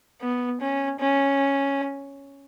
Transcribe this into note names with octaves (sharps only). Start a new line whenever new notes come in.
B3
C#4
C#4